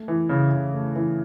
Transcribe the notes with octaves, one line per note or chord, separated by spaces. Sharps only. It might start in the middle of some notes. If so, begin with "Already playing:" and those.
Already playing: A3
E3
C#3
C#3
A3
E3